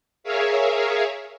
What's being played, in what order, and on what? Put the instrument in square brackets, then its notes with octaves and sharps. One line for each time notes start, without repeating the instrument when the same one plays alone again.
[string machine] G#4 A#4 C#5 E5 F5